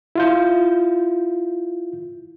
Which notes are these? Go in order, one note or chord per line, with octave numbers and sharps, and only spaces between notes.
E4 F4 G6